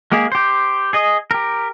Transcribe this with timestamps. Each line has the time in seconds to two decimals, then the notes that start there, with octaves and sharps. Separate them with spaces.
0.12 G#3 A#3 G4 G#4
0.32 G4 C5
0.93 G#4 D#5
1.31 G4 A#4